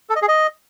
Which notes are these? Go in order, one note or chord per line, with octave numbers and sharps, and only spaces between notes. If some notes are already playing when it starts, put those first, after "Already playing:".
A4
D#5
G#4
D#5